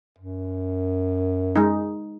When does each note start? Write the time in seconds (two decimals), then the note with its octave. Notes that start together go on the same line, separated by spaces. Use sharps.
0.19 F#2
1.56 G#3 D#4